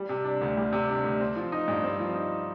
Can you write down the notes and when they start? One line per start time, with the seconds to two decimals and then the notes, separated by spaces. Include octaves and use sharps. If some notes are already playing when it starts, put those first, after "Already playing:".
Already playing: G3
0.09 C3
0.24 D4
0.41 D2
0.57 G3
0.72 C3
0.89 D4
1.04 D2
1.20 C4
1.36 F3
1.52 D#4
1.68 G2
1.84 C4
2.00 F3
2.15 D#4